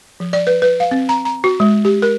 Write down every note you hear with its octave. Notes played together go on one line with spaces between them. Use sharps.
F3
D5
B4
B4
F5
C4
A#5
A#5
F#4
G#3
G4
A#4